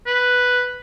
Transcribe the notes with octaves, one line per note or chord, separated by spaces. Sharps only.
B4